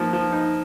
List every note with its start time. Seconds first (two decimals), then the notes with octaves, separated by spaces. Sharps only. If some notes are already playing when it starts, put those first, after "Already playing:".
Already playing: F3 A#3 D#4
0.13 F3
0.32 D#4